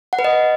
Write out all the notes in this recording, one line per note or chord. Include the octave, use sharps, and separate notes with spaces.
F#5
B4
D#5